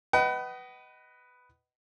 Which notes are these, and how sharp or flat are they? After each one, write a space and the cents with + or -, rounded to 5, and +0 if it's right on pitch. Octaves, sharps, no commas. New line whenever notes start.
B4 +5 D#5 +0 F#5 +40